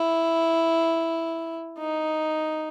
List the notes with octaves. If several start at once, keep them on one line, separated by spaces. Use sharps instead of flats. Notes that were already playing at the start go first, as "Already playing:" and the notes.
Already playing: E4
D#4